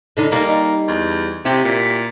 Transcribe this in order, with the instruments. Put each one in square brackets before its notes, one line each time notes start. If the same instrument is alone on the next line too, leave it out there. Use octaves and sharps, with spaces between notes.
[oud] A2 D3 D#4
[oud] G3 D#4 [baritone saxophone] A#3
[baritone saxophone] E2
[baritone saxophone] C3 [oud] E4 G4
[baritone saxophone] A#2